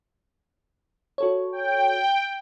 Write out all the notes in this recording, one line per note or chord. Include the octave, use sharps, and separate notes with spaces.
F#4 A4 C#5
G5